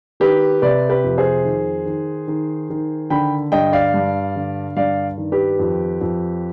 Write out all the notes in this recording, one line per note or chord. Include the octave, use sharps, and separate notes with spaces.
D#3 G4 B4
C3 B4 D5
G4 B4
F2
G#4 C5
D#3
D#3
D#3
D#3
D3 G5 B5
G2 D#5 G5
D5 F5
G2
D3
G2 D5 F5
D#3
G4 B4
F2
F2